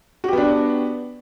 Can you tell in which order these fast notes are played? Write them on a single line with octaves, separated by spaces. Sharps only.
F#4 G4 B3 D4